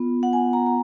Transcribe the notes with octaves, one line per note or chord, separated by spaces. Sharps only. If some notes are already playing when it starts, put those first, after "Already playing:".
Already playing: B3 F4
F#5
G#5
A#5
A#5